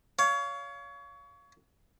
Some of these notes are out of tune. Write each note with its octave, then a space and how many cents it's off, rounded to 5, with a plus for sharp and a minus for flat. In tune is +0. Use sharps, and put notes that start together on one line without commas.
C#5 +25 F5 +0